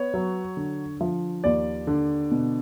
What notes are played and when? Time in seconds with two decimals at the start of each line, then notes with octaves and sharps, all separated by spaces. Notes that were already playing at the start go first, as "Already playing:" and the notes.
Already playing: B3 C#5
0.14 F#3
0.57 D3
1.01 F3
1.44 D#2 D5
1.87 D3
2.31 B2